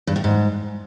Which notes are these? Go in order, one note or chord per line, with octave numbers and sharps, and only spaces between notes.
G2
A2
G#2